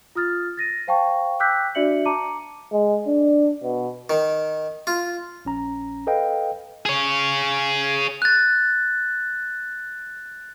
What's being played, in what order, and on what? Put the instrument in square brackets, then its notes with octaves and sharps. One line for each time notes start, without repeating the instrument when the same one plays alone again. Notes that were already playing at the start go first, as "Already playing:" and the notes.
[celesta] F4 D#6 F6 A6
A6 A#6 D#7
C5 F5 G5 A5 C#6
G5 D6 E6 F#6 G6 B6
D4 F#4 D5 E5 C#7 F#7
A5 A#5 D6 C#7 D#7
[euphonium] G#3
D4
B2
[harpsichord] D#3
F4
[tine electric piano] A#1 C#4 A#5
A4 B4 D#5 F5 G5
[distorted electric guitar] G#4 C#5
[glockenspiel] F#6 A6